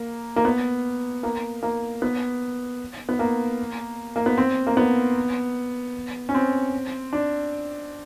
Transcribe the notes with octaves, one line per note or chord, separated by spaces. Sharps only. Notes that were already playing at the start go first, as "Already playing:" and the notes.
Already playing: A#3
A#3
B3
A#3
A#3
B3
B3
A#3
A#3
B3
C4
A#3
B3
C#4
C4
D4